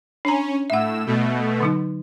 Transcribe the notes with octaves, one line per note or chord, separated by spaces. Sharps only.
C#4 D4 A#5
A2 E5 F#5 E6
B2 A3
D3 F#3 D#4